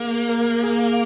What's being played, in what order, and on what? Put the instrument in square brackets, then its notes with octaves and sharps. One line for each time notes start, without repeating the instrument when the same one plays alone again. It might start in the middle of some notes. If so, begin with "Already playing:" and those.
Already playing: [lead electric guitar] A#3 [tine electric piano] G#4
[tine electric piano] A#4
G#4